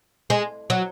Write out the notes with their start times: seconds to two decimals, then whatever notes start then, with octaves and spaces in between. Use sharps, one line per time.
0.30 G#3
0.70 F#3